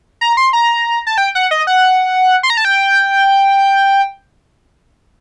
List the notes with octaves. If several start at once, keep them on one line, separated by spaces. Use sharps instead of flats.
A#5
C6
A#5
A5
G5
F#5
D#5
F#5
C6
A#5
A5
G5